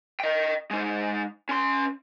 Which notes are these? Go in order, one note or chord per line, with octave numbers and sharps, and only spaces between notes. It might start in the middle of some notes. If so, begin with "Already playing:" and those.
D#5 G5
G#3 D#4
C#4 C6